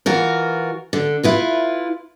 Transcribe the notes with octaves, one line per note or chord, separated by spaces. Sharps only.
E3 F4 F#4 A#4
D3
E4 F4 B4